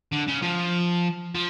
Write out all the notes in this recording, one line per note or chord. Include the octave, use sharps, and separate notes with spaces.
D3
C#3
F3
F3